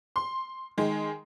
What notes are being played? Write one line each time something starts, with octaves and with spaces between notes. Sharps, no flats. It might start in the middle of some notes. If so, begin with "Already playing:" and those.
C6
D#3 G#3